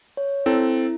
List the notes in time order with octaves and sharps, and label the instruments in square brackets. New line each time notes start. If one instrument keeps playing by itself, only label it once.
[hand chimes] C#5
[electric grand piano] C4 A4 [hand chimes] E4